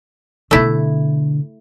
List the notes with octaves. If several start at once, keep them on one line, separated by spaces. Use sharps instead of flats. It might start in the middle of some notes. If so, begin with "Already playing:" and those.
B2 D3 A3 E4